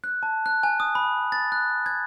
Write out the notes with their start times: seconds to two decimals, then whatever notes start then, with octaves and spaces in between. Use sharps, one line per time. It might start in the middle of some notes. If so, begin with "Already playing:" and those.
0.04 F#6
0.23 A5
0.46 F#6
0.63 G#5
0.80 D#6
0.95 B5
1.32 A6
1.52 F#6
1.86 G#6